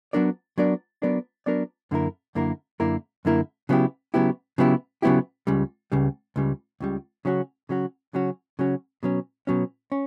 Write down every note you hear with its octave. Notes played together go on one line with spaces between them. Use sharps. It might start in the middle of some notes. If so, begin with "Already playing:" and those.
F#3 B3 D4 A#4 D5
F#3 B3 D4 A#4 D5
F#3 B3 D4 A#4 D5
F#3 B3 D4 A#4 D5
F#2 D3 A#3 E4 A#4
F#2 D3 A#3 E4 A#4
F#2 D3 A#3 E4 A#4
F#2 D3 A#3 E4 A#4
C#3 F#3 B3 E4 G4
C#3 F#3 B3 E4 G4
C#3 F#3 B3 E4 G4
C#3 F#3 B3 E4 G4
C#2 C#3 G3
C#2 C#3 G3
C#2 C#3 G3
C#2 C#3 G3
C#3 F#3 C#4 F#4
C#3 F#3 C#4 F#4
C#3 F#3 C#4 F#4
C#3 F#3 C#4 F#4
B2 F#3 C#4
B2 F#3 C#4
C#4